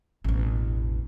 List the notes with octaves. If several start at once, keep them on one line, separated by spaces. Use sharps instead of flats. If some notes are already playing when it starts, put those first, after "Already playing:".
E1 A1